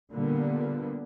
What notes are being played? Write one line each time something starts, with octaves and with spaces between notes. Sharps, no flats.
A#2 D3 G3 A#3 B3